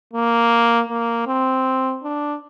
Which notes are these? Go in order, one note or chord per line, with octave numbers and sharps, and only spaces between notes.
A#3
A#3
C4
D4